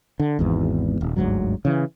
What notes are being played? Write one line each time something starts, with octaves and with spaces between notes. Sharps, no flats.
D3
G#1 E2 G#2
D#1
G1 D2 G#2 F#3
C#3 E3